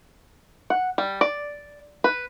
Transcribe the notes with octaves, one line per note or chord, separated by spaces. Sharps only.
F#5
G3
D5
B4